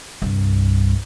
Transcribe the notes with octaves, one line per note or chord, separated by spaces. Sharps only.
C2 G2